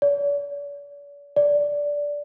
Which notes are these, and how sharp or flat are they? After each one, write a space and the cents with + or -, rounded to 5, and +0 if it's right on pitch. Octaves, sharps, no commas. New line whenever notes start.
D5 -45
D5 -10